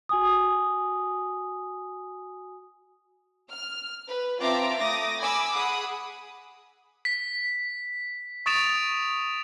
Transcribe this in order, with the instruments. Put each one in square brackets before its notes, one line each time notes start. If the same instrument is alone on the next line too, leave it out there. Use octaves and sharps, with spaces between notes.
[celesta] F#4 G#5 D#6
[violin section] F6
B4
C4 F4 E5 A5 A#5 D6
A3 D6 D#6 A#6
G#5 B5 D6 E6
G#4 F#5 B5 D#6
[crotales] B6
C#6 D#6 A6 D7 E7 F7